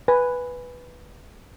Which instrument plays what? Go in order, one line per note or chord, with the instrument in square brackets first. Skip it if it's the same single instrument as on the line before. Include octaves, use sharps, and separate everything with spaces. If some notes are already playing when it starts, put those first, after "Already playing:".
[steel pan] B4 G#5